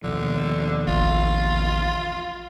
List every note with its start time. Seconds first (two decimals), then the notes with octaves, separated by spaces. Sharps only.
0.04 D#2 B2 D3 F3
0.87 A1 F4